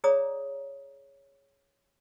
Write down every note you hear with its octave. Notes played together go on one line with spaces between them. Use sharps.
G#4 C#5 D5 A#5 D#6